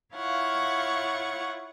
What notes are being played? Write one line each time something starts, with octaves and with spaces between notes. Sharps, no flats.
E4 F4 C#5 F5 F#5 C#6